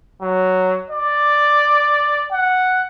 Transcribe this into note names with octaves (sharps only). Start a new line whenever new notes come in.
F#3
D5
F#5